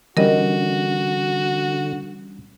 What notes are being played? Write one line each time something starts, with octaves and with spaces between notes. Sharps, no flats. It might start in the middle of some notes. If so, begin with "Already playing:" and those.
D3 E3 G3 C#4 F#4 A#4 D#5